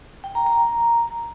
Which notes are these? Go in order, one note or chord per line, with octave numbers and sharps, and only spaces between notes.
G5
A#5
A#5